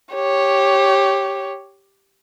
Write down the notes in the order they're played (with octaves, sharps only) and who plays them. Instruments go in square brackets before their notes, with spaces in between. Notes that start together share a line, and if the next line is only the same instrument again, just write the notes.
[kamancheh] G4 C#5